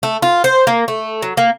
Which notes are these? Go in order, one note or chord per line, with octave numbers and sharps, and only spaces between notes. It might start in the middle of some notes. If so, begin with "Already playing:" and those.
A3
F4
C5
A#3
A3
F#3
A#3